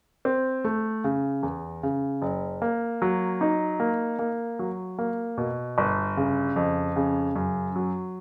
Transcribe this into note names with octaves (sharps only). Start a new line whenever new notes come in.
C4
A3
C#3
E2
C#3
F#1
A#3
F#3
D#4
A#3
A#3
F#3
A#3
B2
G1
C#3
F2
C#3
F#2
F#3